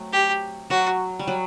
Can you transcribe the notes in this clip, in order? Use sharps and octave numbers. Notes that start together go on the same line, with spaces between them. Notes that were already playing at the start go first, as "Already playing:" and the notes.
Already playing: F#3 A3 C4
G4
F#3 F#4
G3
F#3